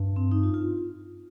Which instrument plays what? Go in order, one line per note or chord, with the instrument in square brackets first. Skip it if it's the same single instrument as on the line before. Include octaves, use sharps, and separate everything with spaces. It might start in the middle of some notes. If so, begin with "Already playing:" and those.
Already playing: [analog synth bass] G2
[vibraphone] C4
D#4
F4
F4